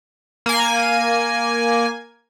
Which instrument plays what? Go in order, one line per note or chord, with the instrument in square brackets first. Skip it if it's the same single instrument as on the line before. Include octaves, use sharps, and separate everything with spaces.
[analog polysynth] A#3 G#5